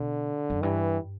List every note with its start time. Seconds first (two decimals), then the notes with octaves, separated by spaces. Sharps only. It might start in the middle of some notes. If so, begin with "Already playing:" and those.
Already playing: B2 D3
0.50 F#2
0.62 G2 E3